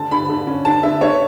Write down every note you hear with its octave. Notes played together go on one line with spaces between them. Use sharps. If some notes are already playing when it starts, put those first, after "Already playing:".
Already playing: D3 A5
D3 B5
D3
C#4
D3 A5
D3 E5
D3 C#5